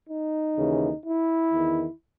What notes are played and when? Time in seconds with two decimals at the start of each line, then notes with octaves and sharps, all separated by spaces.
0.09 D#4
0.57 D#2 C#3 E3
1.04 E4
1.52 E2 D#3